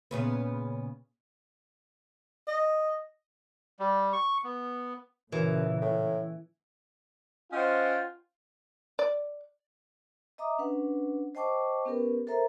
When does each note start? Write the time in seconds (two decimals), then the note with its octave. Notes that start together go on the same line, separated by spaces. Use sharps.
0.11 A#2 C#3 B3
2.48 D#5
3.79 G3
4.13 C#6
4.44 B3
5.32 F#2 A#2 C#3 E3
5.82 A2
7.53 C#4 F4 C5 D#5 F#5 G5
8.99 D5
10.38 D#5 E5 A#5 D6 D#6
10.59 C#4 D4 B4 F#5
11.35 C5 D#5 G5 A5 C#6 D6
11.85 B3 C#4 G4 A#4 B4
12.27 A4 A#4 C5 E5 A#5